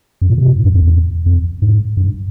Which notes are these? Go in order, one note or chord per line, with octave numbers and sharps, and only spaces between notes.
F#2
A#2
C3
A#2
G#2
F#2
F2
E2
F2
G#2
G2